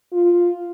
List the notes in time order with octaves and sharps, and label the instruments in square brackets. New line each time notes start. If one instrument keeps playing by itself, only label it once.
[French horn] F4